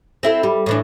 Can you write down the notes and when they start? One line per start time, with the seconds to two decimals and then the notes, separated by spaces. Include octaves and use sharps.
0.23 C4 E4 A4
0.43 G3
0.66 A2 E3 D4